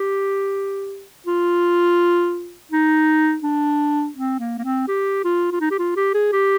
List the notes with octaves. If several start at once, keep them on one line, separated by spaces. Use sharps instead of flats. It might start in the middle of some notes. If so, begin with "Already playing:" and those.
Already playing: G4
F4
D#4
D4
C4
A#3
A#3
C4
G4
F4
F4
D#4
G4
F4
G4
G#4
G4